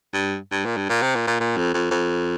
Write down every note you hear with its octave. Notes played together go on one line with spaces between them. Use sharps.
G2
G2
A#2
G2
A#2
C3
A#2
A#2
A#2
F2
F2
F2